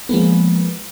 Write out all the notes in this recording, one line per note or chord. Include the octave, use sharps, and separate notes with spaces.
F3 G#3 A#3 B3